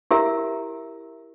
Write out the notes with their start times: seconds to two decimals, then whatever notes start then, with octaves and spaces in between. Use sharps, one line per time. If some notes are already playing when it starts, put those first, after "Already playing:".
0.11 E4 G4 A#4 E5